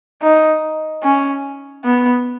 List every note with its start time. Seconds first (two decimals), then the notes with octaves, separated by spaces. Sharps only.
0.22 D#4
1.03 C#4
1.84 B3